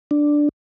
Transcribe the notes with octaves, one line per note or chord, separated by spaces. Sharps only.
D4